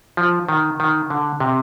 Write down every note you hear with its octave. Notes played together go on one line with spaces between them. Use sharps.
F3
D#3
D#3
D3
C3